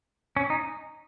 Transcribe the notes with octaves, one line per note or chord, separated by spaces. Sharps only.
C#4
D#4